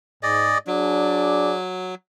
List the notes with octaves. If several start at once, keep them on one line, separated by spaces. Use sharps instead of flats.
G#2 G#4 D5 D#5
F#3 D4 G#4 D5